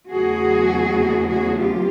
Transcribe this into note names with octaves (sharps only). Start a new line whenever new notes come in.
E2 C#3 F#3 A3 F#4 G#4
F#4 G#4
F4 G4